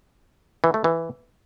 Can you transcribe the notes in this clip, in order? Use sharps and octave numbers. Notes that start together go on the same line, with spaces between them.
E3
A3
E3